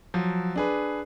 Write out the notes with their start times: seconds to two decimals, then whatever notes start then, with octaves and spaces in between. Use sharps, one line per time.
0.14 F3 F#3
0.56 D4 G#4 B4